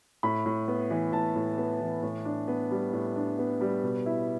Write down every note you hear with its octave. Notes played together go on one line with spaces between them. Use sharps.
A2 B5
A2
B3
E3
A2 A5
A2
B3
E3
A2
D4
B3
G3
A2
D4
B3
G3
B2
E4